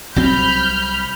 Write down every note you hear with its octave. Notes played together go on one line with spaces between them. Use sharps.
C2 F#3 C4 B5 F6 G6